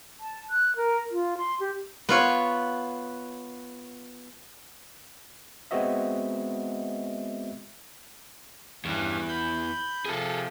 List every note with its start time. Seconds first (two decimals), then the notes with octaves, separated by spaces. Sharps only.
0.20 A5
0.50 F#6
0.76 A#4
1.11 F4
1.38 C6
1.60 G4
2.09 B3 F4 C#5
5.71 G#3 B3 C4 F#4 D#5 E5
8.85 E2 G2 E3 C#4
9.29 B5 G6
10.05 C3 F3 G#4 A4